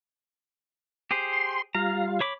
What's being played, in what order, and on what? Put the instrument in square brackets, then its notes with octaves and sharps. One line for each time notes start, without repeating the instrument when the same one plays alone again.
[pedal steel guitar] G4 G#4 C5
[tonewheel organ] C6
[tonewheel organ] G3 F4 F5 [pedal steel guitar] A#5
[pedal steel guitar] C#5 B5 D6